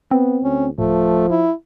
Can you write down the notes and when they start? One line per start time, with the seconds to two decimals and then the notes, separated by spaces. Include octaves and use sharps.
0.11 B3 C4
0.44 D2 C#4
0.79 D1 F3 A3
1.30 E4